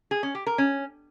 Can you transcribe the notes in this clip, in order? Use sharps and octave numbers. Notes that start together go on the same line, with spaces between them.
G#4
C#4
G4
A#4
C#4